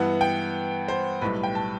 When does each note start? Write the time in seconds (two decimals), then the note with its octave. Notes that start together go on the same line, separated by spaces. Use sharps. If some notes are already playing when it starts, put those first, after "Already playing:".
Already playing: G2 E3 B3 F#5
0.21 G5
0.88 C5
1.21 B1 A2 G3 B4
1.43 G5
1.55 A5